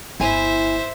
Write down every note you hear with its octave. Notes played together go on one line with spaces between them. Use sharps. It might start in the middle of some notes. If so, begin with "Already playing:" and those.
G1 E4 C5 E5 G#5